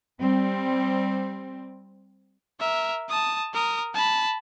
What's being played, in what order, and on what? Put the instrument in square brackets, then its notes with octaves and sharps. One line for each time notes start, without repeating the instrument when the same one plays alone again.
[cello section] G3 C4
[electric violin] A#4 E5
A5 D#6
A#4 D#6
A5 B5